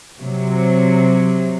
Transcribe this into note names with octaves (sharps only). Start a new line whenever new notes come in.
C3 F#3